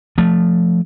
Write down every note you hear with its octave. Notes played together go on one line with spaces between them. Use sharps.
F3 A3